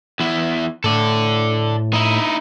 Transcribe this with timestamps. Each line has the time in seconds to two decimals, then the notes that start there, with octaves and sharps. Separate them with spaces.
0.20 E2 E4
0.84 A2 A4 D5
1.93 D#4 E4